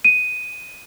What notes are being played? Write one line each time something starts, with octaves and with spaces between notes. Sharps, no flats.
D#7